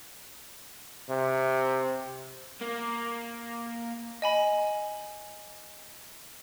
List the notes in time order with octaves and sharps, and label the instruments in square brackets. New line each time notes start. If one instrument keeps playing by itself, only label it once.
[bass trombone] C3
[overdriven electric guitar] A#3
[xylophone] D#5 G#5 B5